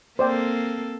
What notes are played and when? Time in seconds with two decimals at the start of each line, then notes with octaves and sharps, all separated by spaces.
0.19 A#3 C4 A4 C5 D5 G5